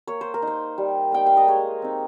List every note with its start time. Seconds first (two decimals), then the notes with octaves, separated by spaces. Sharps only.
0.07 A#3 C#5
0.21 C5
0.34 A#4
0.42 D#4
0.47 C5
0.78 G3
1.12 A#3 D#4 G5
1.26 F5
1.37 D#5
1.47 G#3 C#5
1.82 C4 D#4